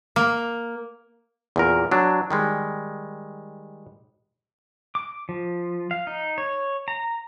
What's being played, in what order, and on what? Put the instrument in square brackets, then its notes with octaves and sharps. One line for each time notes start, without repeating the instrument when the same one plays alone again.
[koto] A#3
[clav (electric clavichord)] E2 A#2 A#4
F#3 D4
D#3 G3 G#3
[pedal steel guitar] D6
F3
F5
D#4
C#5
A#5